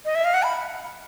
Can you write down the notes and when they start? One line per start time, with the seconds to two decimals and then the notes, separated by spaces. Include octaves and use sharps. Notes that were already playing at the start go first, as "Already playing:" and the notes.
0.05 D#5
0.15 E5
0.25 F5
0.34 F#5
0.43 B5